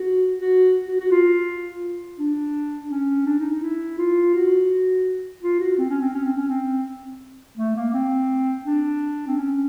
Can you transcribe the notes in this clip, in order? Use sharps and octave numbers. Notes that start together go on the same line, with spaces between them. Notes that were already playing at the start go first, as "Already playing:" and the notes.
Already playing: F#4
F#4
F#4
F#4
F4
D4
C#4
D4
D#4
D#4
E4
F4
F#4
F4
F#4
C4
C#4
C4
C#4
C4
C#4
C4
A3
A#3
C4
D4
C4
C#4